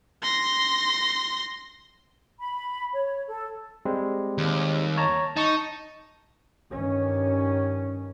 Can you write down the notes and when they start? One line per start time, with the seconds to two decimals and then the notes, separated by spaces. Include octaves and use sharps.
0.22 C6 A#6
2.39 B5
2.93 C#5
3.27 A4
3.85 G3 G#3 C4
4.38 D#2
4.97 C#5 A5 A#5
5.36 D#4 A5 C#6
6.71 G2 D#3 C#4